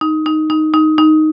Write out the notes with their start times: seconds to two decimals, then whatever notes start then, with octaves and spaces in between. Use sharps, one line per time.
0.01 D#4
0.26 D#4
0.50 D#4
0.74 D#4
0.98 D#4